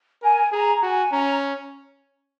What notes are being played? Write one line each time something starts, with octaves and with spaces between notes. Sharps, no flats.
A#4 G#5
G#4 A#5
F#4 G#5
C#4 A#5
A#5